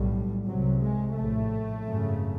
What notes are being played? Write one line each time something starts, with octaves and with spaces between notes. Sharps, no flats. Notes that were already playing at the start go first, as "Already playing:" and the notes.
Already playing: B1 A2 G3
C2 C3 F#3
G#3
A#1 A2 A3
G#1 F#2 C#3